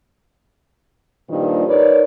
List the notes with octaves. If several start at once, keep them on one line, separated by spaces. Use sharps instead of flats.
G2 A#2 D#3 F3 G3
D#4 A#4 B4 C#5 D5